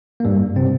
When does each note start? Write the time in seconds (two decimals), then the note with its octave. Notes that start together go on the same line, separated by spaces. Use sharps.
0.20 A#3
0.25 G2 G3
0.56 C3 C4